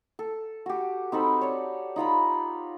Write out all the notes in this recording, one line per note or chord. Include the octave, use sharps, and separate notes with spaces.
A4
F#4 G4
C4 D#4 A4 B5
C#5 D5
D#4 F4 A#5 B5